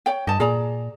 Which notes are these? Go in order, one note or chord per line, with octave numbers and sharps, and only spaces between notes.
C#5 G5
G2 D#5 A5
A#2 G#4 D5 A#5